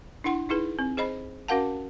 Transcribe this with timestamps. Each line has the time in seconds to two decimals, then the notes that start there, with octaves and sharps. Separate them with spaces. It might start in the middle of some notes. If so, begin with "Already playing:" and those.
0.24 D4 E4 F#5 C6
0.49 D#4 E4 G#4 B4
0.79 C4
0.97 G#4 C5 D#5 B5
1.48 C#4 F#4 A#4 F5 F#5 A5